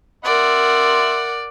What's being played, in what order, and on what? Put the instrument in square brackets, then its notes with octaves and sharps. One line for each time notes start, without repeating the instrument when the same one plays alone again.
[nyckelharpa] A#4 F#5 [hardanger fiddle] D5 [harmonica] E5 C6